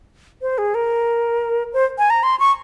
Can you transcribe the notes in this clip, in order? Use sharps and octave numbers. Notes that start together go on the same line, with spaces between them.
C5
G#4
A#4
C5
G#5
A#5
C6
C#6